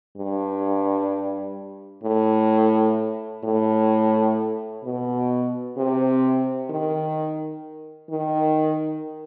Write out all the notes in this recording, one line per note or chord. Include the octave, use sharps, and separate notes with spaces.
G2
A2
A2
B2
C3
D#3
D#3